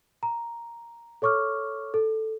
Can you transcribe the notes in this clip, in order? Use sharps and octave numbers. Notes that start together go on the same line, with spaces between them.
A#5
A4 C#5 C#6 D6 F6
A4